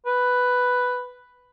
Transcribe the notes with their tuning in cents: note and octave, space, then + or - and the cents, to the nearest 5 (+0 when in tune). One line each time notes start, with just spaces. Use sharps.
B4 +5